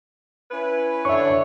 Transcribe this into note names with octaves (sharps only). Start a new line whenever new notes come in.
C#4 E4 B4
D3 D4 C#5 E5 C#6